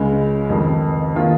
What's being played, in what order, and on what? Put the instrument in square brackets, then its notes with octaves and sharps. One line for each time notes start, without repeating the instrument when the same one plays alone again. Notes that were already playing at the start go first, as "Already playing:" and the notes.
Already playing: [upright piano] C#2 C#3 G#3
F1 F2 D#3
D#3 A#3 F4